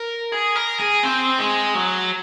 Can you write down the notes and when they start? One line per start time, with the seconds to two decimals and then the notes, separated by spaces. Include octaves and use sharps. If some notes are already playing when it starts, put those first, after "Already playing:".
Already playing: A#4
0.32 G#4
0.56 A#4
0.79 G#4
1.03 C4
1.39 G#3
1.75 F#3